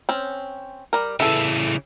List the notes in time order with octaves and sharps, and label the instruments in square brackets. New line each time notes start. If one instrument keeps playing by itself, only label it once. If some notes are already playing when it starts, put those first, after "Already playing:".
[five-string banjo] C4 C#4
G3 A#4
[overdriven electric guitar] C#3 E3 [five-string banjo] E4 A4